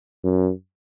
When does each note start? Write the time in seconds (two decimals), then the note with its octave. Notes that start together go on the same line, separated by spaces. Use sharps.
0.24 F#2